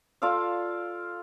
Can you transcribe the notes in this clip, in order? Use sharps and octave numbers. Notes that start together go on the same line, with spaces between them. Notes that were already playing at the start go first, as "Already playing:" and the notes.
F4 A4 D5 F5